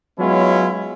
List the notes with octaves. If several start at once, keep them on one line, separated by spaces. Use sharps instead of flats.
F#3 G#3 B3 C#4 E4 F4